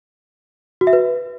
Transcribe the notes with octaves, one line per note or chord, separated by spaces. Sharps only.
F#4
E5
B4